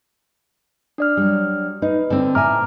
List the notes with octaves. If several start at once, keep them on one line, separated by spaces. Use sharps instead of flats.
D4 D5 F6
F#3 G3
D#4 B4
D3 C4
A2 E5 G#5 A#5 D6 F6